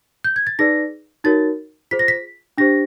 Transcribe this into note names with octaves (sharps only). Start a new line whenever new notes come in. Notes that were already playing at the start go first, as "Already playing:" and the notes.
G6
G#6
A6
D#4 G#4 B4 D5 A#6
D#4 F#4 A#4 C#5 A6
F4 G#4 C5 B6
A#6
B6
D4 G4 C5 A#6